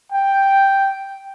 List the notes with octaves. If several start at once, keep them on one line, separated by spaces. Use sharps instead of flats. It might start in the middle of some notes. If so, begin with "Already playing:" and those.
G5